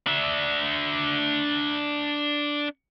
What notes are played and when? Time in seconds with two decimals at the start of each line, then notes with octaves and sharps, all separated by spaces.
0.07 D4 E5